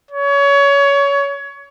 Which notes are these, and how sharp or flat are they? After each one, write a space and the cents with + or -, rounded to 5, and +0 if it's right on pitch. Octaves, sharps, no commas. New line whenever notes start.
C#5 +25